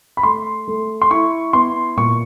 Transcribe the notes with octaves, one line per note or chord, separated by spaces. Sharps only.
B5
A3 C6
A3
C6
E4 C#6
B3 C6
A#2 C#6